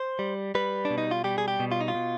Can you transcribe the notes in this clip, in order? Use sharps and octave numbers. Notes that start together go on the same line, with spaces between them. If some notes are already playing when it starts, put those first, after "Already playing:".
Already playing: C5
G3
G3 B4
D4
B2
D#4
F4
G3 G4
G#4
G4
B2
F4
D#4
F4
B2